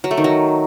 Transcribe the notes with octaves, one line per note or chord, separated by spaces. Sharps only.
F#3
A3
D#3
F#3